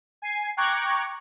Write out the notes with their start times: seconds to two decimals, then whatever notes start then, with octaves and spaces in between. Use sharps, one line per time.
0.22 G#5 C7
0.57 G5 A#5 C#6 D6 F#6 G#6